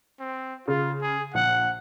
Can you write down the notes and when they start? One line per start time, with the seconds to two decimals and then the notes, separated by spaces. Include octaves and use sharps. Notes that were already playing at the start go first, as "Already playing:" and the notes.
0.20 C4
0.68 C#3 F4
1.02 G#4
1.34 A#1 F#5